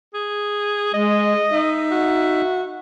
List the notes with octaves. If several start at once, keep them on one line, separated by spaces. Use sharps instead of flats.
G#4
G#3 D#5
D#4 E5
F#4